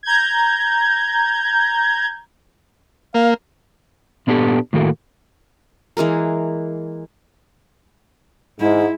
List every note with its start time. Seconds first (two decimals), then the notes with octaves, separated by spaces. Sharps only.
0.03 A#5 G6 G#6
3.14 A#3 F5
4.27 A#2 B3 D4 F#4 G4 A4
4.73 A2 D#3 A#3 F#4 A4
5.97 E3 G#3 A#3 A#4
8.59 G#2 G#3 E4